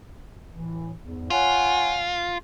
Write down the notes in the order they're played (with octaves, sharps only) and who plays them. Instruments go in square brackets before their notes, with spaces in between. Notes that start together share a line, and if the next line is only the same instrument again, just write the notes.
[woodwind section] A2 E3
E2 G#2
[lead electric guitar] F4 [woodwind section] C#5 F#5 G#5